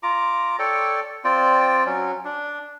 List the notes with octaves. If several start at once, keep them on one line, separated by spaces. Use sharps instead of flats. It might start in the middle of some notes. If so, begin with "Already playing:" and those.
F4 A#5 D6
A4 C#5 D5 G5
C4 F4 D5 G5
F#3 C#4
D4